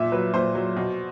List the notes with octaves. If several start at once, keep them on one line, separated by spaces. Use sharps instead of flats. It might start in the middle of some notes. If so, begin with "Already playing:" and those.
Already playing: A#2 E5
F#3 B4
A#2 C5
F#3
B2